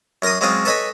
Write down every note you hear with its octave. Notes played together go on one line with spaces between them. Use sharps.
F#2 A#4 A#5 C6 D#6
F#3 G#3 C4 C#4 F4 D#5
A4 B4 C#5 D#5 G#5 B5